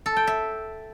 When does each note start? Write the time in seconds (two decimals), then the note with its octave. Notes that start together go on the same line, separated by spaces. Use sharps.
0.06 A4
0.17 G5
0.27 E5